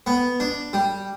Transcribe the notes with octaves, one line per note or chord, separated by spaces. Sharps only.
B3
D4
G3